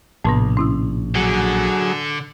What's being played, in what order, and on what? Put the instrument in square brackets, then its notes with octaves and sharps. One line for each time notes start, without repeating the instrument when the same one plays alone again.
[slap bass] A#1 [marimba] A2 C3 B3
[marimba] C#4 E4 E6
[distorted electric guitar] D3 [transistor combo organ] F#3 G#4